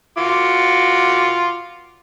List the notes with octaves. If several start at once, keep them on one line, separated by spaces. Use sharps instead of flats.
F4 F#4 D6